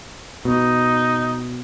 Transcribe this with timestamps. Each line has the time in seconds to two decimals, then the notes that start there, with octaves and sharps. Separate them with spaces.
0.45 B2 D#4